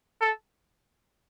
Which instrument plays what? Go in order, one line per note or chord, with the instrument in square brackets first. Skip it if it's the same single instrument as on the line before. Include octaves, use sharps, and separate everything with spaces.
[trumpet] A4